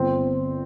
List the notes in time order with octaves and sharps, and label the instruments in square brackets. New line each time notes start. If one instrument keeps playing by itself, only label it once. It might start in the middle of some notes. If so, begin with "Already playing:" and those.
Already playing: [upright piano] G1 C4